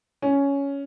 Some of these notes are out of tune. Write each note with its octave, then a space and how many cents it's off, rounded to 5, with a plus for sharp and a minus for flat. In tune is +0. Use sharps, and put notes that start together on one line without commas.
C#4 +10